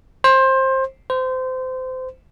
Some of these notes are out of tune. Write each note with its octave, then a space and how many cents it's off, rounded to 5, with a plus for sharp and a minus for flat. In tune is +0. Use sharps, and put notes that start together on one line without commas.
C5 +20
C5 -25